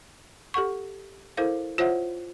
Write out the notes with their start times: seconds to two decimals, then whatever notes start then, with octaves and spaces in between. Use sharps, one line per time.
0.54 G4 A4 F#5 C#6
1.37 E4 A4 A#4 C5 F5
1.78 F4 C5 C#5 E5 F#5